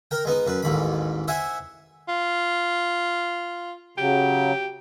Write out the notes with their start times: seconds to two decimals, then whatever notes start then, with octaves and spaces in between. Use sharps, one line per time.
0.11 A#4 G5
0.25 G#3 B3 D#4
0.47 F#2 B4
0.63 A1 D#2 G#2 B5
1.28 C5 E5 F#5 G#5
2.08 F4
3.98 C#3 F#3 G4